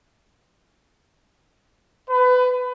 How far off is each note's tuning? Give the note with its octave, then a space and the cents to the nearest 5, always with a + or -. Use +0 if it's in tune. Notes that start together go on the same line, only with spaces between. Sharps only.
B4 +25